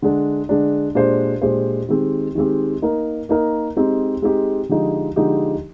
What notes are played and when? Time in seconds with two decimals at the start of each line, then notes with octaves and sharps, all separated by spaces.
0.02 D3 G#3 D4
0.49 D3 G#3 D4
0.95 A#2 G#3 D4 G4 C5
1.42 A#2 G#3 D4 G4 C5
1.89 D#3 G#3 C4 G4
2.35 D#3 G#3 C4 G4
2.82 A#3 D#4 A#4
3.29 A#3 D#4 A#4
3.76 G#3 C4 D#4 G4
4.22 G#3 C4 D#4 G4
4.69 D3 F3 G#3 D#4 G4
5.16 D3 F3 G#3 D#4 G4